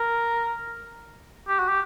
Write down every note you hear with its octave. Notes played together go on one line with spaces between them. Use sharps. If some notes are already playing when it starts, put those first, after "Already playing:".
Already playing: A#4
G4
F#4
G4